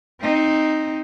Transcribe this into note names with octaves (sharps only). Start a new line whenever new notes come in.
C4 D#4